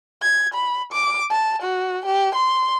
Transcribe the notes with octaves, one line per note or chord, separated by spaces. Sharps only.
G#6
B5
D6
A5
F#4
G4
C6